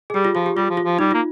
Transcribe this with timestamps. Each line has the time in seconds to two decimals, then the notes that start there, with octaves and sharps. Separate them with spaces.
0.10 G#4
0.14 G3 G4
0.25 F4
0.35 F3 F4
0.46 G4
0.56 G3 F4
0.70 F3
0.77 F4
0.85 F3
0.99 G3 D#4
1.11 A#3 F4